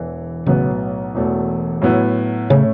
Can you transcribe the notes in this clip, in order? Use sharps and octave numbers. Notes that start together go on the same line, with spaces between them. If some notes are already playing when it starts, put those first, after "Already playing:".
Already playing: E1 E2 E3
B1 A2 C#3 F#3 B3
E1 E2 B2 A3
A2 F#3 B3 E4
A2 C#3 A3 C#4